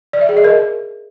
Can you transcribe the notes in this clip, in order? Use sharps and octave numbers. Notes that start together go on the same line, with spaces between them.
D5
E5
G#4
D#5
A#4